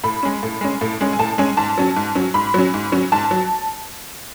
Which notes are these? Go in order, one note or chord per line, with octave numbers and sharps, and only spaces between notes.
A2 B5
G#3 C#4
A2
G#3 C#4
A2
G#3 C#4
G#5
A2 A5
G#3 C#4 G#5
G#2 A5
F#3 C#4
G#2
F#3 C#4
G#2 B5
F#3 C#4
G#2
F#3 C#4
G#2 A5
F#3